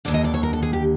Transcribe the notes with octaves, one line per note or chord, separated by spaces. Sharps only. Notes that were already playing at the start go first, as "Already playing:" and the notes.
D#2 D3 D5
D#5
D5
C#5
A#4
A4
G#4
G4